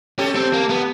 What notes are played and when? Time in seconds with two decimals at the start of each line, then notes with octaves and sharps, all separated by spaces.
0.19 C#4 G4 A4
0.35 C4
0.53 A#3
0.70 B3